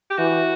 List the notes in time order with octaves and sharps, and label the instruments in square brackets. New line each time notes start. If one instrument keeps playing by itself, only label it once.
[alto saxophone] G4
[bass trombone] E3 [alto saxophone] F#4